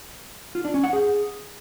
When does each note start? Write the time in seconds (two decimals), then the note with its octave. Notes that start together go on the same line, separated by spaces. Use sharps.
0.55 F4
0.65 D4
0.74 C#4
0.84 F#5
0.93 G#4